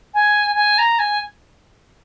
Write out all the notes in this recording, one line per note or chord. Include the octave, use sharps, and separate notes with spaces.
G#5
G#5
A#5
G#5